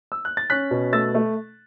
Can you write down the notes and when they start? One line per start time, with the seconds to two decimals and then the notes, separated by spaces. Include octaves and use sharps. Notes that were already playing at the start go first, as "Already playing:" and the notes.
0.12 E6
0.25 F#6
0.37 A6
0.50 C#4 F#6 B6
0.71 B2
0.92 A3 E6 A6
1.14 A3